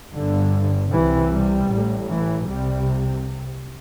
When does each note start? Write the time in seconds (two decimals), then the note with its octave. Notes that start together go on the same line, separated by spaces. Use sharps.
0.14 G1 G2 D3
0.91 C2 C3 E3
1.31 G3
1.70 A1 A2
2.09 E3
2.48 C2 C3 G3